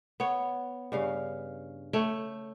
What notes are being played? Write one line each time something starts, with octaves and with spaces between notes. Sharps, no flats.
B3 C#5
G2 C#3 F5
A3 C#5 G5